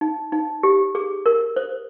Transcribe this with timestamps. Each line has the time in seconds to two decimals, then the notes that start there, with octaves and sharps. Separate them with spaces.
0.01 D#4
0.32 D#4
0.63 G4
0.95 G#4
1.26 A#4
1.56 C5